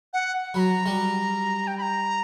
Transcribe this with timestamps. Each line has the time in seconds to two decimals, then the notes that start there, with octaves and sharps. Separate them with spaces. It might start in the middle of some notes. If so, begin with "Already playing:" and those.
0.13 F#5
0.54 F#3 B5
0.59 A#5
0.86 G3
1.67 G5
1.78 B5
1.82 A#5